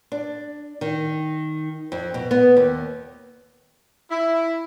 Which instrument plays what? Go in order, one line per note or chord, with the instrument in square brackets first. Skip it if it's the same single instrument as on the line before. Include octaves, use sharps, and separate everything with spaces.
[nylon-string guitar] D4
D#3
F2
B2
B3
D#2
[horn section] E4